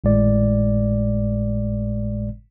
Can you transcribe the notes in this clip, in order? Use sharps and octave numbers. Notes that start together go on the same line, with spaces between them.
G#1 A2 G#3 D5